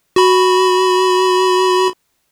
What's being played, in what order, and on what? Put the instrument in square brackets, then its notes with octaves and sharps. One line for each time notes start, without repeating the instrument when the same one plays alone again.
[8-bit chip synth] F#4 B5